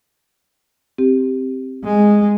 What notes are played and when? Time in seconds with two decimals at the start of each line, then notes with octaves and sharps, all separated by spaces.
0.98 C4 G4
1.84 G#3